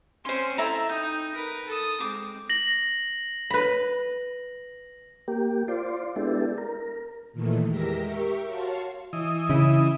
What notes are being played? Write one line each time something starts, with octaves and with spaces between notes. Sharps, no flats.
C4 C#4 C5 C6
E4 A4 E5 A#5
D#4 G5
A#4 B4
A4 D#6
G#3 C4 D6
A#6 F#7
B4 B5
A#3 G4
F4 C5 D5
G#3 B3 D4 E4 G4 A4
A#4
A#2 D#3 E3 A3
E2 G#3 G4 A#4 E5 A#6
G4 A#4 E5 C#6
F#4 C#5 F5 A5 C6
E3 D#5
C#3 E4